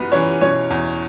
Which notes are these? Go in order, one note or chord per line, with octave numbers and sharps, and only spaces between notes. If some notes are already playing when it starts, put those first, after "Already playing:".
Already playing: F#2 E3 B3 B4
E3 C#4 C#5
B2 C#4 C#5
E2